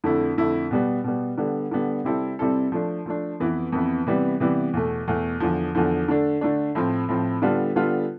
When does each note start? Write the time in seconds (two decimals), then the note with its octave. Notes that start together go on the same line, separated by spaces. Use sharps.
0.04 F2 D3 A3 E4
0.37 F2 D3 A3 E4
0.71 B2 G3 B3
1.04 B2 G3 B3
1.38 D3 G3 B3
1.71 D3 G3 B3
2.04 C3 G3 C4 E4 A4
2.39 C3 G3 C4 E4 A4
2.72 F3 A3 D4
3.06 F3 A3 D4
3.40 F2 E3 B3 E4
3.72 F2 E3 B3 E4
4.07 C3 E3 G3 B3
4.40 C3 E3 G3 B3
4.73 E2 B2 A3
5.07 E2 B2 A3
5.40 E2 D3 F3
5.75 E2 D3 F3
6.08 D3 A3 D4
6.41 D3 A3 D4
6.75 A2 F3 C4
7.08 A2 F3 C4
7.42 D3 G3 B3 F4 A4
7.76 D3 G3 B3 F4 A4